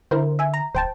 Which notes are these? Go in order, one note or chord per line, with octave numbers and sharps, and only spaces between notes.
D3 E4 A#4 C5
E5 G#5
A#5
D1 C5 G5 A5